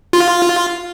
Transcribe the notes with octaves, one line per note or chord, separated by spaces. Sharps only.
F4